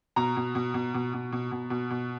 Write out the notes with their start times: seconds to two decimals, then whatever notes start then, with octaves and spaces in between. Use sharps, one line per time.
0.16 B2 A#5
0.36 B2
0.55 B2
0.74 B2
0.94 B2
1.13 B2
1.32 B2
1.51 B2
1.70 B2
1.90 B2